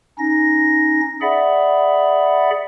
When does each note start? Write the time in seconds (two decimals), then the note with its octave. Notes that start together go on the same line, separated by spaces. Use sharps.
0.19 C#4 D#4 A#6
1.22 G#4 D5 E5 F#5 B5